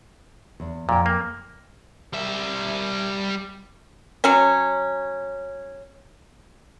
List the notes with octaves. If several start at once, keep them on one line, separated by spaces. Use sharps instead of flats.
E2
F2 A#2 G5
A#3
G3 E5
F#3 C#4